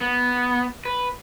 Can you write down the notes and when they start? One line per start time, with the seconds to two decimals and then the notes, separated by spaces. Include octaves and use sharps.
0.01 B3
0.85 B4